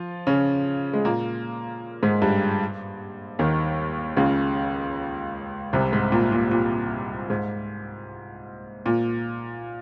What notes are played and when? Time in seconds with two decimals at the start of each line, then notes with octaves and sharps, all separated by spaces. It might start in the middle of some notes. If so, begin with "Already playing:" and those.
Already playing: F3 F4
0.27 C#3 C#4
0.93 G#3
1.05 A#2 A#3
2.03 G#2 G#3
2.22 G2 G3
3.39 D#2 D#3
4.17 C#2 C#3
5.73 C2 C3
5.93 G#2
6.12 A#2
6.32 A#2
6.51 A#2
7.30 G#2
8.86 A#2